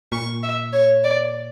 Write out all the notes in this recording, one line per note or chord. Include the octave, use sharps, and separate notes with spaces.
A#2 C#6
E5
C#5
D5